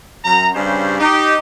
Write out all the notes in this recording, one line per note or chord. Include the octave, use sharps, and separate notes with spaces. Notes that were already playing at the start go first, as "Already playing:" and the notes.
F#2 A#5
G2 C#3 G3 C#4 C5 D5
D#4 G4